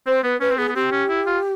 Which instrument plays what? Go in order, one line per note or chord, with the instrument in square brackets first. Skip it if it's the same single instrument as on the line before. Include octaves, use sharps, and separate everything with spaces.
[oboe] C4 [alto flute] C5
[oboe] B3 [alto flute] B4
[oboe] C#4 [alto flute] B4
[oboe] C4
[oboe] B3 [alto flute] G#4
[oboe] B3
[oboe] C4 [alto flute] G4
[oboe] C#4
E4
F4